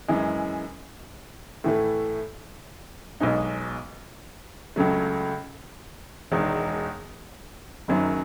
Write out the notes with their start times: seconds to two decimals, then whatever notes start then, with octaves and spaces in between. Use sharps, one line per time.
0.08 F#2 E3 G#3
1.64 A2 E3 A3
3.20 B1 B2 G#3 D#4
4.76 C#2 C#3 F#3 A3
6.32 E1 E2 D#3 G#3
7.88 F#1 F#2 D#3 F#3